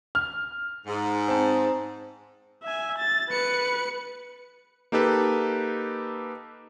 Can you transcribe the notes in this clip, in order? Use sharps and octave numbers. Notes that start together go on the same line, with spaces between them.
F6
G#2
C4 A5
E5 G#5
A6
B4 C#7
A#3 D#4 G4 A4 B4